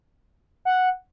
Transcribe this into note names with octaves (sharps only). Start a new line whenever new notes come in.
F#5